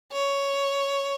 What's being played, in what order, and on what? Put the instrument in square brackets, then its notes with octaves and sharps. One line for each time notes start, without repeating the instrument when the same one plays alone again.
[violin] C#5